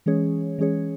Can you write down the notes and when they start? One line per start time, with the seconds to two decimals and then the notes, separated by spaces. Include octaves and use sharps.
0.06 E3 G#3 C#4 G#4 C#5
0.58 E3 G#3 C#4 G#4 C#5